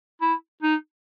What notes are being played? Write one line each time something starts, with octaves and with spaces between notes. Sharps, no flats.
E4
D#4